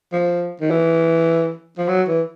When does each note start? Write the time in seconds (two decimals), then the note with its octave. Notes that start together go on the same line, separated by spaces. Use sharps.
0.13 F3
0.61 D#3
0.70 E3
1.78 F3
1.88 F#3
2.08 E3